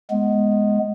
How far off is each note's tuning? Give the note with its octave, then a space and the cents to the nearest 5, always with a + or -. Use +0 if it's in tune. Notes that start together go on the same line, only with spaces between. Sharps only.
G#3 +10 B3 +0